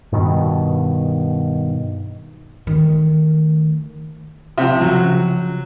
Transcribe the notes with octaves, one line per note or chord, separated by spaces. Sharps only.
G2 B2 D#3
D#3 A3
C3 F3
C#3 F3 F#3